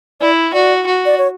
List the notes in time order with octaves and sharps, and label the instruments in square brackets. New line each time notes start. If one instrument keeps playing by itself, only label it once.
[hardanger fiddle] E4 [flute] D5
[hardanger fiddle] F#4 [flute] D5
[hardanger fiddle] F#4
[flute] D5
C#5